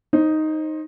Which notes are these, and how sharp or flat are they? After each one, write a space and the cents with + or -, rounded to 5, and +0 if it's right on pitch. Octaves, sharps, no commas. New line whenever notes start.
D#4 +0 C5 +30